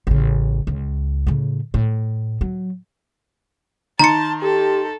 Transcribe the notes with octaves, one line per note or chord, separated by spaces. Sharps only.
A1 C#3
C#2
A2 C#3
A2
F#3
D#3 A5 A#5 C6 C#7
G4 A4